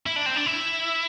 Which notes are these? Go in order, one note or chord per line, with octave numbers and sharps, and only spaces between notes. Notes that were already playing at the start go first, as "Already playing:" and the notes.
E4
D4
C4
D4
E4